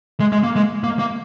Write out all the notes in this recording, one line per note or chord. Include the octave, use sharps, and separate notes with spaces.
G#3
G#3
A#3
G#3
A#3
A#3